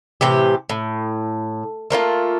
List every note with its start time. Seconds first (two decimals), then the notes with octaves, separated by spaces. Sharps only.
0.21 A2 C3 E3 G4
0.70 A2
1.90 A3 A#3 C#4 F4